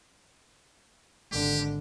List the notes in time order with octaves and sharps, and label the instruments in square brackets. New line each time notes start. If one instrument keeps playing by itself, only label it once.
[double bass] G#1 D3 [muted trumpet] G4